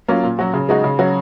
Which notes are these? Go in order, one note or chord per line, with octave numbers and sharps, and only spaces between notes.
F#3 A#3 C#4 F4
A#2
F#3 C#4 F#4
C#3
G#3 D#4 F#4
C#3
F#3 C#4 F#4